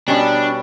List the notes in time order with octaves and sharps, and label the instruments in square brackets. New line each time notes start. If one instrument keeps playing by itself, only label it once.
[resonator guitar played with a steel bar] B2 G3 C#4 [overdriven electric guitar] D4